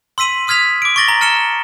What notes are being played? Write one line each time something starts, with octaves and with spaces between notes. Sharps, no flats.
C6 E6 B6 D#7 F#7
C6 D#6 F6 G#6 B6 F7
D6 D7
C#6 D6 A6 A#6 F#7 G7
A#5
A5 F6 C#7 E7 G7